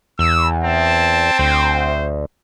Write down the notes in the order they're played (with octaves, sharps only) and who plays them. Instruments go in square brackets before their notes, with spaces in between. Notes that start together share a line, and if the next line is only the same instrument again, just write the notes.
[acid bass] E2 [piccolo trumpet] E6
[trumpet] C4 [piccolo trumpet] A5
[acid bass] D2 [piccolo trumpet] C5